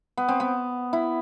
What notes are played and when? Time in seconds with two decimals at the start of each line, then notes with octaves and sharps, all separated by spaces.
0.17 B3
0.28 C4
0.40 B3
0.93 E4